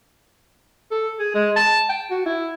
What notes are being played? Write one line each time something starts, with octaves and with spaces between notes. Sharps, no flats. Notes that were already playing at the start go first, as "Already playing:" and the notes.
A4
G#4
G#3
A5
G5
F#4
E4